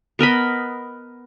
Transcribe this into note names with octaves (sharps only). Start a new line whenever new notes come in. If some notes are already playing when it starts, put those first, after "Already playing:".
B3 A#4 D#5 B5